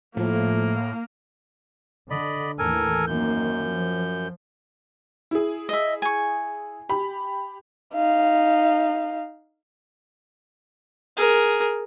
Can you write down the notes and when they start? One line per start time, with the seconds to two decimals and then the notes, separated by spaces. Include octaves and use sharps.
0.17 A2 F3 A3 A#3
2.10 D3 D5 D#5 B5
2.59 D#2 A2 E3 A4 A#4 G#5
3.07 F#2 D#3 A#3 C4 G6
3.68 F3
5.31 E4 G#4
5.69 D#5 E5
6.02 G#5 C#6
6.89 G4 B5
7.94 D#4 F5
11.17 G#4 A#4